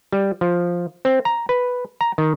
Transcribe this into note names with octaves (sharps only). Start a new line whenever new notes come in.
G3
F3
C4
A#5
B4
A#5
D#3